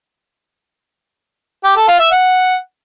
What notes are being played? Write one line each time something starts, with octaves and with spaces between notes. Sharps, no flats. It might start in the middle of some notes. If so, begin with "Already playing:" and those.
G4
A4
F4
E5
F#5